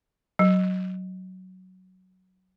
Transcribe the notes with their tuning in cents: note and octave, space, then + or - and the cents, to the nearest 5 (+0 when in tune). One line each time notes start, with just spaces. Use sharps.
F#3 +5